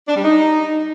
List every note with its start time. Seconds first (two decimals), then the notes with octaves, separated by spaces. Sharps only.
0.08 D4
0.16 G3
0.24 D#4